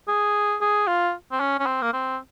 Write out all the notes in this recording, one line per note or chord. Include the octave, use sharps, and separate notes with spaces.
G#4
G#4
F4
C4
C#4
C#4
C4
A#3
C4